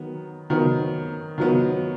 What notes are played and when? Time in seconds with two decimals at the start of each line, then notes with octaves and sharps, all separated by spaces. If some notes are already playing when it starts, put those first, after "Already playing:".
Already playing: D#3 F#3 B3
0.50 D#3 F#3 B3
1.38 D#3 F#3 B3